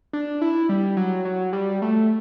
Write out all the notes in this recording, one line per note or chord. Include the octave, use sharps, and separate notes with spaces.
D4
E4
G3
F#3
F#3
G3
A3